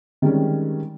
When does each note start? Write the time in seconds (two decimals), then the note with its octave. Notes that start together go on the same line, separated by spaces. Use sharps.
0.22 D#3 G3 G#3 C4 C#4